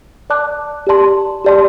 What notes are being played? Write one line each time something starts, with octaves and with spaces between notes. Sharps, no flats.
D5 A5 D6 F#6
G4 D5 A5 C6
G4 D5 A5 C6